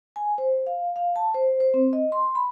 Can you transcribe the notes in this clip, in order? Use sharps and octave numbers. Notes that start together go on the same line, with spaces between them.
G#5
C5
F5
F5
A5
C5
C5
C4
D#5
C6
B5